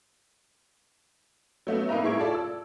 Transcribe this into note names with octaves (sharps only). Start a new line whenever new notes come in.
F#3 A3 B3
A#3 D#4 B4 E5 A#5
A2 G#3 E5 C#6 G#6 D7
F4 A4 D5
E6